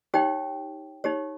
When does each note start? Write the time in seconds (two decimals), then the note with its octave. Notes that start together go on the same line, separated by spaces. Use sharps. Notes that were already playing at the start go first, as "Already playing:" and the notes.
0.14 D#4 G4 C#5 G5
1.04 D#4 G4 C#5